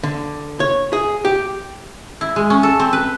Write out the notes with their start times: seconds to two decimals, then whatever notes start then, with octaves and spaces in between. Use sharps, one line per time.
0.03 D3
0.60 C#5
0.93 G#4
1.25 G4
2.21 E4
2.36 G#3
2.50 C#4
2.63 A4
2.80 C4
2.93 B4